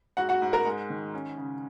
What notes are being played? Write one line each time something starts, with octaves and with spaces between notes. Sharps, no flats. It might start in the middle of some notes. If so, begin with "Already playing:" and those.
G#2 F#4 F#5
F#4 F#5
G#2
A#4 A#5
G#3
D#3
C#4
C#3